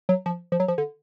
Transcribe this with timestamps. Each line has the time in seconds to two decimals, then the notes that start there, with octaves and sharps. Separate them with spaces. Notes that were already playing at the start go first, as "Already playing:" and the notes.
0.09 F#3
0.26 F3
0.52 F3
0.60 F#3
0.68 F3
0.78 D3